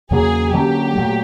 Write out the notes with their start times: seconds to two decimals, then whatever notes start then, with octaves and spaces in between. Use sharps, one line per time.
0.11 E2 C#3 F#3 A#3 G#4
0.53 D3 F#3 A#3 C#4 G4
0.95 A#2 F#3 A3